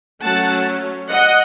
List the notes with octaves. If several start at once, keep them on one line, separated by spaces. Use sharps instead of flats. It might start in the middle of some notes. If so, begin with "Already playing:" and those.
F#3 A3 C#4 F#5 A5
D#5 F#5